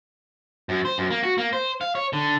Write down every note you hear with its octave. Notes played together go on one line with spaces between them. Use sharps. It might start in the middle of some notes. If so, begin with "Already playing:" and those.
F#2
C5
F#2
A#3
F#4
A#3
C5
F5
C#5
D3